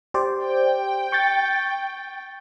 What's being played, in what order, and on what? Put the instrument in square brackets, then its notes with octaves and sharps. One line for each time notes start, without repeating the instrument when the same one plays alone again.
[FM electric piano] G4 C5 D5
[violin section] G5
[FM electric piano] C#6 G6 A6